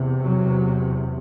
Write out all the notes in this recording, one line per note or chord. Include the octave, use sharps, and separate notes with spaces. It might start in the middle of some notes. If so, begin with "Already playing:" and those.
Already playing: E2 C3
F#3